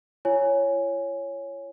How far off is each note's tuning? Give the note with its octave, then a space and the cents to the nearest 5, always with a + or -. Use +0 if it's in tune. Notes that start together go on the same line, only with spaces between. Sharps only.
F4 -45 C#5 +0 G#5 +0